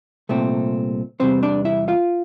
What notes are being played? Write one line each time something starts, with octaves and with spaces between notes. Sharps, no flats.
C2 A#2 A3 C4
E2 C3 E3 G3 C4 C5
D4 D5
E4 E5
F4 F5